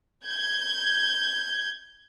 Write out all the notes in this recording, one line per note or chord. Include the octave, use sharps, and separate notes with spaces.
G6 G#6